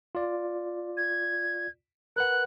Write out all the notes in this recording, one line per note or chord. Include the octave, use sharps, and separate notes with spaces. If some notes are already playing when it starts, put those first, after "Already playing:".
F4 D5
G#6
A#4 B4 F#5 F#6